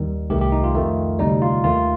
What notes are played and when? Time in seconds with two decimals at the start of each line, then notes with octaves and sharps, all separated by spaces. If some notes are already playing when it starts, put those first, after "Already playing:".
Already playing: D#2 D#3 G3
0.30 C2 C3 D#3 A3 G4
0.41 G4
0.52 D#4
0.64 F4
0.75 F2 D#3 A3
1.19 D2 C3 G3 D#4
1.42 F4
1.64 D#2 D#3 A3 F4